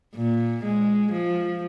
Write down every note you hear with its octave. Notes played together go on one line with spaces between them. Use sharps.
A#2
G#3
F3